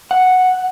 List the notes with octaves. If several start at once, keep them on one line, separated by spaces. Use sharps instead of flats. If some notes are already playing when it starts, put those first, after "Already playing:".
F#5